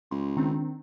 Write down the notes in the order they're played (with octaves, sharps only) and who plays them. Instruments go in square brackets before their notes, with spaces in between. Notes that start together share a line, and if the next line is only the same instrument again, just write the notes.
[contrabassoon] C#2 [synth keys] C6
[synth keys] D#3 C4 D4